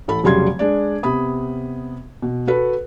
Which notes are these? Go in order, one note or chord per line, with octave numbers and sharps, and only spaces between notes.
A1 A4 B5
F1 C#3 F#3 G3 C6 G#6
G#3 D4 D5
C3 B3 B5 D#6
B2
F#4 A4 B4